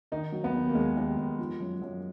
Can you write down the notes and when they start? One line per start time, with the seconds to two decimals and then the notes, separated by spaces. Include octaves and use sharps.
0.12 D#3 D#4
0.32 F#3
0.44 B3
0.54 D#2
0.69 A#3
0.75 D#2 G#3
0.97 D#2
1.17 D#2
1.39 F3
1.60 F#2
1.82 F#2